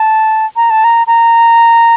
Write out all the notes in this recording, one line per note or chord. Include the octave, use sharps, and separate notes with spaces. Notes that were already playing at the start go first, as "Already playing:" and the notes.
Already playing: A5
A#5
A5
A#5
A#5